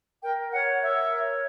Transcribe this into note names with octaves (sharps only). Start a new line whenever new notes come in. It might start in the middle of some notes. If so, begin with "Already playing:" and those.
A#4 G5
C#5 F#5
A#4 E5
C#5